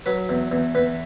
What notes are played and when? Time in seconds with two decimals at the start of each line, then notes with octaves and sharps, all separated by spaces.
0.06 F#3 B4
0.29 E2
0.52 E2
0.75 E2 B4